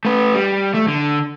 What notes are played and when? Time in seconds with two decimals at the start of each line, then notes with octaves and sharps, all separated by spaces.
0.05 A3 B4
0.35 G3
0.74 A3
0.88 D3